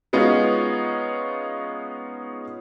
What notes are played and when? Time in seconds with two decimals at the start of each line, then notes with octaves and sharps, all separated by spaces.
0.13 G#3 B3 C#4 D#4 F4